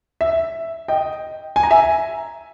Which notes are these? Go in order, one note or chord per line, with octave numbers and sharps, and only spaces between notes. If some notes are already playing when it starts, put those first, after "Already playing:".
E5
D#5 G5
G#5
A#5
E5 G#5